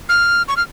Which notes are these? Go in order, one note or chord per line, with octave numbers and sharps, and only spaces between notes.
F6
C#6
F6